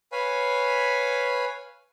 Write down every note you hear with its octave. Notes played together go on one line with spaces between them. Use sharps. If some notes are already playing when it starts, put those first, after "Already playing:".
B4 C#5 F5 G#5 B5